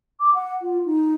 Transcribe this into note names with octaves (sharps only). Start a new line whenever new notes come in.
D6
F#5
F4
D#4